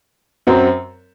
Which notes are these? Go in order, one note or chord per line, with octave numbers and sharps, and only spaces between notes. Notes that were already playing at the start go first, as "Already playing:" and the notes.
F#2 F#3 C4